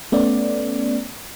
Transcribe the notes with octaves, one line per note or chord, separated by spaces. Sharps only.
A3 B3 C#4 D5